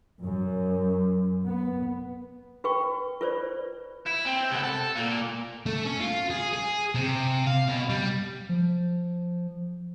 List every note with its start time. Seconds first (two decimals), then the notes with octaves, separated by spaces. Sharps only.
0.22 F#2
1.45 B3
2.64 F#4 B4 G5 C#6
3.21 F4 B4 C5 D5
4.07 E4
4.26 C4
4.51 C2 B3
4.64 A4
4.96 A#2 A#3
5.66 A3
5.85 C#4
6.00 F4
6.30 G#4
6.53 G#4
6.95 C3
7.47 F5
7.68 B2
7.89 G3
8.49 F3